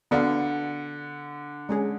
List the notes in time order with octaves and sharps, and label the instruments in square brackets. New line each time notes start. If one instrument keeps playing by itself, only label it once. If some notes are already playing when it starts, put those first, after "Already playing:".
[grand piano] D3 [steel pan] B3 F#4 A4 D5 F5
[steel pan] G#3 C#4 G#4